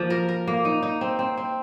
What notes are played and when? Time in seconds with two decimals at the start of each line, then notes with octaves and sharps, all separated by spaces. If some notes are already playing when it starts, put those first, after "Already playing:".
Already playing: F3 A#3
0.10 A#4
0.29 A#4
0.48 A#3
0.65 D#4
0.83 D#4
1.01 C4
1.19 C4
1.38 C4